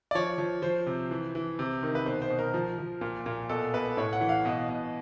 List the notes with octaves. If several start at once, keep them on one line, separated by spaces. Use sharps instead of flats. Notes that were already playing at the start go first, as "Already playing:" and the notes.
D5
F3 C#5
F3
F3 C5
C3
E3
E3
C3
D#3
B4
B2 C5
C5
B2
A#4
F3
F3
A#2
A#2
B2 A4
B2 B4
A2 C#5
F#5
E3
F5
B2 D#5
B2